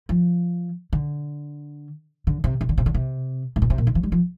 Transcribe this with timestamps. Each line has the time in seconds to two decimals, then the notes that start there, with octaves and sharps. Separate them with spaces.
0.09 F3
0.93 D3
2.27 D3
2.44 C3
2.61 C3
2.69 D3
2.78 C3
2.86 D3
2.94 C3
3.56 A2
3.62 A#2
3.70 C3
3.78 A#2
3.87 D3
3.95 F3
4.03 G3
4.12 F3